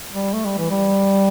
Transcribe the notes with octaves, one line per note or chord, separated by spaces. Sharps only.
G3
A3
G3
E3
G3